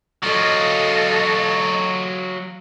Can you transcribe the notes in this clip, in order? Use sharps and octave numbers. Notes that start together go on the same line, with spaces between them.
F#3 F4 A4 D#5